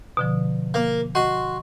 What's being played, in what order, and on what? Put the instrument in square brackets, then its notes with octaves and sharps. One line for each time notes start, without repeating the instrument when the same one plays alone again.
[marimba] B2 D3 F3
[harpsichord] A#3
[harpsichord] F#4 C6 [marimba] D#5